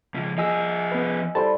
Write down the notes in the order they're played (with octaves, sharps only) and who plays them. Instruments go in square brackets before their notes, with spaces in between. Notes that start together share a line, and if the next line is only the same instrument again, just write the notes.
[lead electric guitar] C#2 F3
[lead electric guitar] F3 G#4 [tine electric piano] D#5 G#5 E6
[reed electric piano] B3 B4
[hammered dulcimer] G3 E4 [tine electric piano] A4 C5 C6 [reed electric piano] A5